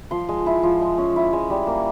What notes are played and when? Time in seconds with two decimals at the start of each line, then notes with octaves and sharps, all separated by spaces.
0.11 F3 C6
0.29 G#3
0.46 E4
0.63 F3
0.81 G#3
0.98 C#4
1.16 E4
1.33 G#3
1.50 G3
1.67 A#3